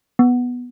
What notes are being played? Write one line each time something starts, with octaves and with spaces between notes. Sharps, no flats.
B3